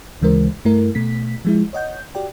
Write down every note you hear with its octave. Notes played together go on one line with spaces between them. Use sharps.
D2 C#3 E3 G#3 A#4 C5
G2 A3 E4 A#4
B2 A3 B6
F3 G#3 E4
C#5 D#5 F#5 G6
F#4 G4 D5 G5